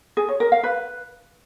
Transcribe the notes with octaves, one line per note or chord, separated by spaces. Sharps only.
G#4
C#5
A#4
F5
B4